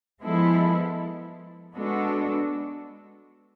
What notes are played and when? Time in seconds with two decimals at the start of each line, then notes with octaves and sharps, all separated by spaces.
0.21 F3 G#3 B3 E4 A4
1.75 G#3 B3 D4 F#4 A4